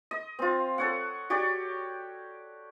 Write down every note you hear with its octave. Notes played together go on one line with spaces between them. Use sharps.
D#5
C4 F4
A4 C#5 F#5
F#4 G4 C#5 D5